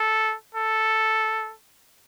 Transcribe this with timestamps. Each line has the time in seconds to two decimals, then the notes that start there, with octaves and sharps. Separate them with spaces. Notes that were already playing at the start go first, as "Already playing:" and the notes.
Already playing: A4
0.55 A4